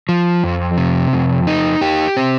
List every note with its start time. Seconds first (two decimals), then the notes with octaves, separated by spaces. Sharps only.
0.09 F3
0.44 F2
0.78 C3
1.13 F2
1.47 D#4
1.81 G4
2.17 C4